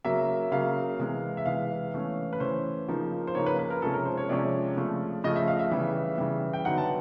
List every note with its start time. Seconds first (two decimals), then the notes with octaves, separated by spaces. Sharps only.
0.05 C#3 F#3 A#3 E5
0.52 C#3 F#3 A#3 F5
0.99 C3 E3 G#3
1.37 E5
1.46 C3 E3 G#3 F5
1.94 E3 A3 C#4
2.33 B4
2.40 E3 A3 C#4 C5
2.88 C#3 F3 A#3 D#4
3.27 C5
3.35 C#3 F3 A#3 D#4 C#5
3.46 B4
3.59 B4
3.71 A#4
3.82 C3 F3 G#3 C#4 A4
3.94 A#4
4.06 C5
4.18 C#5
4.29 C3 F3 G#3 C#4 D5
4.77 C#3 F3 A3
5.24 C#3 F3 A3 D#5
5.36 E5
5.48 F5
5.59 E5
5.71 C#3 E3 G3
6.18 C#3 E3 G3
6.53 G5
6.65 D3 F#3 B3 D#4 F#5
6.78 A5